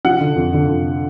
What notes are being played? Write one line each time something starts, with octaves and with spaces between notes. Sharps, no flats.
F3 F#5
D3
F2
D3
F2